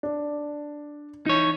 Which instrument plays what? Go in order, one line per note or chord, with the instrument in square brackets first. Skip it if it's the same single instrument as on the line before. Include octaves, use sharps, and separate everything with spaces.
[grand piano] D4
[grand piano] E3 [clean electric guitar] D#4 C#5